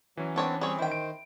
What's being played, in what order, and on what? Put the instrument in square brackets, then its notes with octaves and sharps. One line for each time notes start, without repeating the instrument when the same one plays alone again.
[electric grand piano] E3 C#4 [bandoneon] F#3
[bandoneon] B3 C4 D4 [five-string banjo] A4 C#5 D5
[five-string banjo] G3 C#5 [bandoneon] C4 G#4
[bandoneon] D#3 C5 [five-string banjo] E4 G5
[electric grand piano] D7